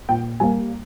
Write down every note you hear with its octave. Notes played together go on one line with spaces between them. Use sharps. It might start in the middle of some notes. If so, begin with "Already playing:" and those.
A#2 G5
G3 A#3 G#5